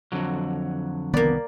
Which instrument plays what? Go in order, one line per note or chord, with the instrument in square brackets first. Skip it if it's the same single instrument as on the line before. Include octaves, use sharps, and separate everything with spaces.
[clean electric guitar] F2 D3 F#3
[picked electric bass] C2 D#3 B3 [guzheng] A#3 D5